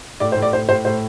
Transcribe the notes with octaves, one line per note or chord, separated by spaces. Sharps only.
A2 D5
C5
A2
D5
A2 C5
A2 C5
A2 C5